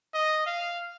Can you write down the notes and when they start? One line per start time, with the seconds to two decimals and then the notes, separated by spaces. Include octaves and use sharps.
0.14 D#5
0.46 F5